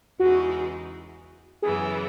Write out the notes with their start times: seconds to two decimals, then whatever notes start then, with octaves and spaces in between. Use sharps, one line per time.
0.20 E2 C#3 E3 G#3 D#4 F#4
1.62 F#2 C#3 E3 B3 G#4